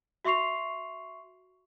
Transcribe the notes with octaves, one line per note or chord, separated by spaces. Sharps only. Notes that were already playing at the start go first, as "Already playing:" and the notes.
F#4 E5 C6 C#6 C7 F7